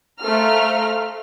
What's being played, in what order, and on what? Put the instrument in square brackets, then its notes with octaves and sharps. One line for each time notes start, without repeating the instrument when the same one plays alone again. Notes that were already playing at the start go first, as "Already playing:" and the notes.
[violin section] A3 C5 F5 A#5 F6